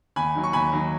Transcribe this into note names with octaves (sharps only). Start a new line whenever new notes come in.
D#2 G#5 B5
D#3 F#3
C#6
D#2 G#5 B5
D#3 F#3